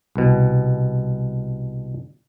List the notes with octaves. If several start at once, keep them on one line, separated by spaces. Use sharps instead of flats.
C2 B2